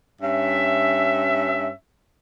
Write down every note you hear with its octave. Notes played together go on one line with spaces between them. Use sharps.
G2 C#4 E5